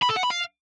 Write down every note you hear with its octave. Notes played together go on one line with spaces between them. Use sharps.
B5
A4
F#5
B5
F5